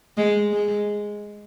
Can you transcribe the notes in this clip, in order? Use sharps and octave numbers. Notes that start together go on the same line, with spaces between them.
G#3
G#3